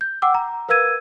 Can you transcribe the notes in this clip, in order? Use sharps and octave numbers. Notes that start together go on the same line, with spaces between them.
G6
F#5 G5 D6 E6
A#5
A#4 B4 F5 E6 G#6 D#7